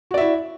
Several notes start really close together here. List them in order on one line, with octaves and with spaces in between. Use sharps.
F#4 D5 E5 E4